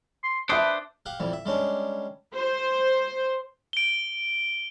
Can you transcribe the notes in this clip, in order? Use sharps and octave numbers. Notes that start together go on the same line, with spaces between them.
C6
D4 B4 C5 E5 A5 D#6
G4 F5 F#5
F2 E3 G3
E5
G3 G#3 C#4 D4
C5
D7 G7